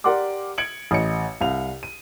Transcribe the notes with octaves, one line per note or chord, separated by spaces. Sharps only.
G4 A#4 D5 F#5 C6 D6
G#6 C#7 D7 F#7
A1 D#5 C#7
C2 F5 F7
D#7